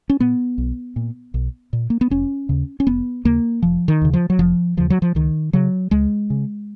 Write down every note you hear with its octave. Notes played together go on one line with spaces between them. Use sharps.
C#4
A#2 B3
B1
A#2
B1
A#2
A#3
B3
F1 C#4
D#2 C#3
C#4
F1 B3
D#2 C#3 A#3
F1 F3
D#3
D#2 C#3
F3
F#3
F1 F3
D#2 C#3 F3
F#3
F3
C#2 D#3
C#3 F#3
C#2 G#3
C#3